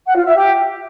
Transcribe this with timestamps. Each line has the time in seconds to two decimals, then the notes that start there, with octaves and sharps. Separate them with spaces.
0.06 F#5
0.15 F4
0.25 E5
0.35 G4